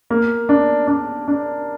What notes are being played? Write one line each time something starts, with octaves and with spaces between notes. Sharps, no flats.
A#3
D4
D4
D4